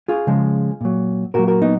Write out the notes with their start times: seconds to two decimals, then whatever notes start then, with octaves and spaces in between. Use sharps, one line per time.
0.08 F4 G#4
0.27 C#3 F3 G#3
0.81 A#2 F#3
1.34 A#2 F#4 A#4
1.39 F#3
1.47 F#4 A#4
1.62 B3 D#4